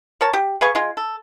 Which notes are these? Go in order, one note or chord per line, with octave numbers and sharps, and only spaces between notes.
A#4 C#5 A5
G4
G#4 B4 F5 C#6
G#3 F4
A4